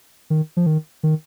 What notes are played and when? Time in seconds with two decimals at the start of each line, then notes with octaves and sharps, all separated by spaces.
0.30 D#3
0.57 F3
0.66 D#3
1.03 D#3